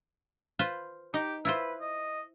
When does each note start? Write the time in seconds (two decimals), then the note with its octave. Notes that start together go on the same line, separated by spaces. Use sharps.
0.59 F4 B4 C5
1.14 D#4 G4
1.45 E4 F4 B4 C5
1.81 D#5